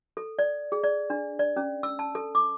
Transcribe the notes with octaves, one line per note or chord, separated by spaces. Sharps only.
A4
D5
G#4
D5
D4
D5
C#4
E6
A5
A4
D6